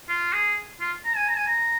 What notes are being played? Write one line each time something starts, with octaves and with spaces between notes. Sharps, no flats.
F4
G#4
F4
A#5
G#5
A#5
G#5
A#5